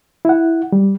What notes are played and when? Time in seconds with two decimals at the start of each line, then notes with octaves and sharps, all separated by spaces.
0.25 E4 F#5
0.72 G3